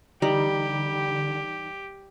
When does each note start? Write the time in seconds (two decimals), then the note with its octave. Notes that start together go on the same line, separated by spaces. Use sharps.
0.22 D3 E3 G3 D#4 G4 A#5